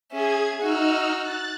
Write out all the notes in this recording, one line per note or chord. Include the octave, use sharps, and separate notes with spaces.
C#4 G#4 E5 G#6
D#4 F#4 E6 F6
F#6 A6